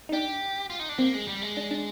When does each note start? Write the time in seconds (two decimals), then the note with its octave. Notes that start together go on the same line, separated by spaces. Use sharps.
0.09 D#4
0.12 D4 G4
0.70 F4
0.80 D#4
0.89 D4
0.98 A#3 C4
1.14 G#3
1.28 G3
1.42 G#3
1.57 D4
1.71 D4